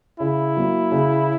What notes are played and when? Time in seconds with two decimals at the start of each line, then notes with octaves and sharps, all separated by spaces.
0.20 C#3 E4
0.57 F#3 A#3
0.92 C#3